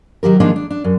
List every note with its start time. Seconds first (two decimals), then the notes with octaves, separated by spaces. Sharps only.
0.23 D#3 F#3 G4 A#4
0.40 D#3 F3 G#3 A#3 D4 D#4
0.56 D4
0.70 D4
0.84 F#2